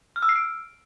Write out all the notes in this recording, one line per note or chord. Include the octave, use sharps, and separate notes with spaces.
F6
E6
C7
D7